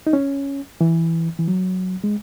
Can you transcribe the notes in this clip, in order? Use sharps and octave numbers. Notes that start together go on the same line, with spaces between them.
D#4
C#4
E3
E3
F#3
G#3